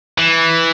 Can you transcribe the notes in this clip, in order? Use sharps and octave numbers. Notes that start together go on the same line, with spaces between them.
E3